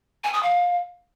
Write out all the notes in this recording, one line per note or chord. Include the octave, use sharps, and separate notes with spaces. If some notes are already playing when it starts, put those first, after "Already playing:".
G#5
D#6
F5